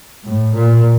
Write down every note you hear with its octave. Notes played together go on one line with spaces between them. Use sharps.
A2
A#2